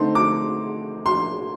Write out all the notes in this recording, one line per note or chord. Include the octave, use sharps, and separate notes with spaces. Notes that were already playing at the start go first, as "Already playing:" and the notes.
Already playing: D3 A3 C4 D#4 C6
D6
C6